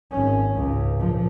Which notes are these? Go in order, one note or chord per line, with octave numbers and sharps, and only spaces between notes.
G#1 C#4
C#2 G#2
A#2 F3